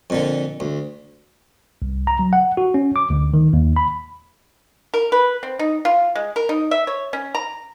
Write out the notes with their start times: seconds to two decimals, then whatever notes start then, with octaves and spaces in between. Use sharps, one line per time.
0.10 F2 A#2 D3
0.60 D2
1.82 C2
2.07 A#5
2.19 F#3
2.33 F#5
2.57 F#4
2.74 C#4
2.96 D6
3.10 D2
3.34 D#3
3.53 D#2
3.76 B5
4.94 A#4
5.12 B4
5.43 C4
5.59 D#4
5.85 F4
6.15 G#3
6.36 A#4
6.49 D#4
6.71 E5
6.87 C#5
7.13 C#4
7.35 A#5